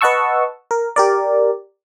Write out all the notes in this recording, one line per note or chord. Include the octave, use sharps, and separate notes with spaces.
B4 D#5 F#5 A5 C#6 E6
A#4
G4 A#4 D5